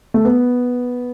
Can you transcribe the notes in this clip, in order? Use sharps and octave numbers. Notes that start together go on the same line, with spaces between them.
A3
B3